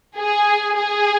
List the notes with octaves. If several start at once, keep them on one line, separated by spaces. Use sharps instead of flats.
G#4
G#4